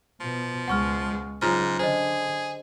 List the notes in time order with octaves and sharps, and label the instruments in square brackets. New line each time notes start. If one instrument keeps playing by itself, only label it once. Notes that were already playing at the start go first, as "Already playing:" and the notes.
[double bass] B2 [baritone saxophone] F3
[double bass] C#2 G#3 [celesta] F#5 C#6 F6
[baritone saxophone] G#2 [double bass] C#3 F#3 [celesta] F4 A#5 F6
[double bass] D3 [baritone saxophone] G#4 [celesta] C5 D#5